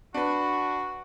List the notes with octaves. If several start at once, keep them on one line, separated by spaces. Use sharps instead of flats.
D4 F#4 B4